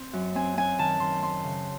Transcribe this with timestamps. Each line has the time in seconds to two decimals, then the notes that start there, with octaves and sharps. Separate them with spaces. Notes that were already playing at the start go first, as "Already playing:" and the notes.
Already playing: C4
0.13 F#2
0.35 C4 G#5
0.57 C4 G#5
0.79 D#3 A5
1.00 D#3 C6
1.23 C4 C6
1.44 C#3